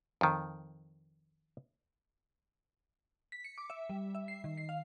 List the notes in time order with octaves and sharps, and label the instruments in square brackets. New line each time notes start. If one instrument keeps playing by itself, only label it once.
[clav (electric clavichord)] F2 D#3
[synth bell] B6
C#7
D6
E5
G3
E5
C7
D#3
C7
F5